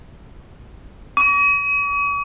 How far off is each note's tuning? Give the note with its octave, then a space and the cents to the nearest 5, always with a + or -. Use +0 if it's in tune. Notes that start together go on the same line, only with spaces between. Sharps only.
C#6 +45